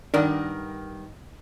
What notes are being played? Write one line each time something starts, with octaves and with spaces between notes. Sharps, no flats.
G2 D#3 D4 A#4 F#5